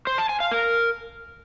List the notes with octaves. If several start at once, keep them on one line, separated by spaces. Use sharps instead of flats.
C5
A5
G#5
F5
A#4